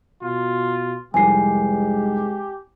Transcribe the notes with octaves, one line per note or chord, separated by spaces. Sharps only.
B2 F4
F1 C2 G#3 G4 G#5 C7